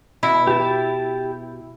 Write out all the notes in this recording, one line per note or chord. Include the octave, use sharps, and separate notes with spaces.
B2 E4
G4 A5